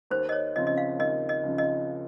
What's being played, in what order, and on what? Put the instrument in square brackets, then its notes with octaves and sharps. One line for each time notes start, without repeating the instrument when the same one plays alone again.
[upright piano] D#2 [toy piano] C5
[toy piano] D#5
C#5
[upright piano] C#3 F3 C4 [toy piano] D#5
[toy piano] D#5
F5
[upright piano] D#2 [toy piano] D#5
[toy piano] D#5
[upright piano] C#3 F3 C4
[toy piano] D#5